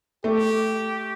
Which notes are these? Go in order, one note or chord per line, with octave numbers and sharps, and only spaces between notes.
A3 G4